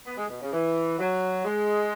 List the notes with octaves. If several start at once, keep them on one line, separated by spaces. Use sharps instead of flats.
B3
G#3
B2
C#3
E3
F#3
G#3